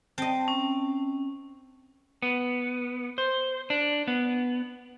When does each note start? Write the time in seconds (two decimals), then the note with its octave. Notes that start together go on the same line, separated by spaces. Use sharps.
0.18 C4 D#5 A5
0.48 C#4
2.22 B3
3.18 C5
3.70 D4
4.08 B3